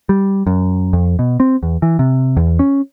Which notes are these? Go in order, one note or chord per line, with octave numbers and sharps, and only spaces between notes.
G3
F#2
F2
B2
C4
E2
E3
C3
E2
C#4